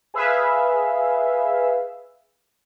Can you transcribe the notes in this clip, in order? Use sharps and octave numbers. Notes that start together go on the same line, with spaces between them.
G#4 B4 E5 F5